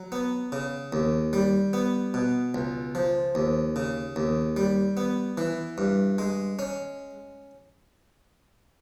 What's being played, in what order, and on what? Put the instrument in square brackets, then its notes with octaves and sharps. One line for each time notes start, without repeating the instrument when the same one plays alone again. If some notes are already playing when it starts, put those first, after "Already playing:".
Already playing: [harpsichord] F#3
B3
C#3
D#2
G3
B3
B2
C#2
F3
D#2
C#3
D#2
G3
B3
E3
G2
G#3
C#4